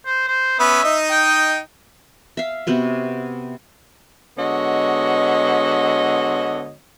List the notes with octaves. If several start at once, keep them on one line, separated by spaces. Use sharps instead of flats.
C5
C5
B3 C#4 E5 B5
D#4 D#5
G5
E5 F5
C3 B3 F#4 C5
D3 G#3 B3 F#4 C#5 D#5